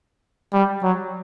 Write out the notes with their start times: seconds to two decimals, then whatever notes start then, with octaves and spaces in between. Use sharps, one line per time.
0.53 G3
0.83 F#3